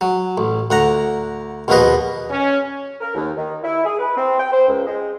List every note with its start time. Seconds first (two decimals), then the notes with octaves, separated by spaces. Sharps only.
0.01 F#3
0.38 A1
0.70 D2 F#5 A#5
1.68 A#1 D#2 B2 F3 B4 D#5
2.31 C#4
3.01 A#4
3.15 D#2
3.37 D#3
3.64 E4
3.85 G#4
3.98 B4
4.16 C4
4.39 G5
4.52 C5
4.68 C#2
4.86 G#3